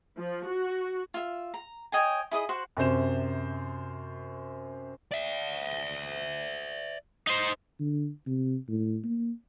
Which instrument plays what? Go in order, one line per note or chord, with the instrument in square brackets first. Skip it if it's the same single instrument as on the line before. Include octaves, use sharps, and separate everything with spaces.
[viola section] F3
F#4
[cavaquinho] F4 E5
A#5
C#5 D#5 G5 G#5
E4 G#4 D#5 D#6
F#4 C5 F#5
[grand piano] F#2 C3 C5 E7
[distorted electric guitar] D5 E5
[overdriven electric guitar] D#4 C5
[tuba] D3
C3
A2
A#3